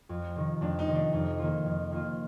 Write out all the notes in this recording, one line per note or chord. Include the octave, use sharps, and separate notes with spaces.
F2
C3 D#3
F2 D4
D#4
C3 D#3
D4
F2 D#4
D#3 A#3 F4
F2
D#3 A#3 F4